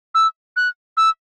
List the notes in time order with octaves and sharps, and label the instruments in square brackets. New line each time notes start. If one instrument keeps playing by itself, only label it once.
[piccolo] E6
F#6
E6